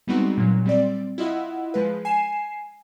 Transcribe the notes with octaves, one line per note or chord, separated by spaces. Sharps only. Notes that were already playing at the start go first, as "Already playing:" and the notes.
G3 G#3 B3 C4 D#4 F#4
A#2 F#3
G3 C4 D5
E4 F4 D#5 F#5
F3 G#3 B4
G#5 C7 E7